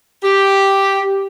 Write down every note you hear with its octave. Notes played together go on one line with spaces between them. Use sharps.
G4